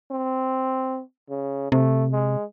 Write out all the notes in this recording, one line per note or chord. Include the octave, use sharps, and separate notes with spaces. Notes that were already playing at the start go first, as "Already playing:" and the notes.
C4
C#3
C3 A3
G#3